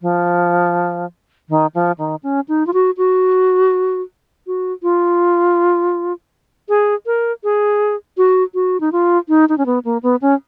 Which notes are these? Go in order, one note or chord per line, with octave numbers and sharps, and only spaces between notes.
F3
D#3
F3
D#3
C#4
D#4
F4
F#4
F#4
F#4
F4
G#4
A#4
G#4
F#4
F#4
D#4
F4
D#4
D#4
C#4
B3
A#3
B3
C#4